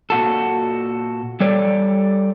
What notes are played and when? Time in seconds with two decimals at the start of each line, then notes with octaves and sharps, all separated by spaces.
0.10 A#2 F#4 A4
1.40 G3 A4 C#5 D5